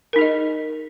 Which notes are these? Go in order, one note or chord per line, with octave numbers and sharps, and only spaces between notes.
D#4 G#4 A#4 D#5